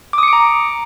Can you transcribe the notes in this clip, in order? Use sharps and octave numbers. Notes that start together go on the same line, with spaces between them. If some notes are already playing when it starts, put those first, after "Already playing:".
A#5 D6 D#6 C#7 D7